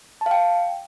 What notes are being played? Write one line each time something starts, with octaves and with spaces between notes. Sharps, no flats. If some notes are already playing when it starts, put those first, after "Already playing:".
A5
F5
G5